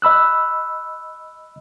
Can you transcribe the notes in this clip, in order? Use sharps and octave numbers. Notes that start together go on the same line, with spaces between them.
D#5 B5 E6 F#6